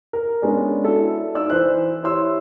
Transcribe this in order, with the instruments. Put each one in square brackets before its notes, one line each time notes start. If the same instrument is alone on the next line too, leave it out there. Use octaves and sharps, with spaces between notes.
[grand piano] A#4
G#3 B3 C#4 D4
E4 F#4 A4 D5
D#4 D5 E6
E3 B4 C5 F#6
E4 G4 C#5 C6 E6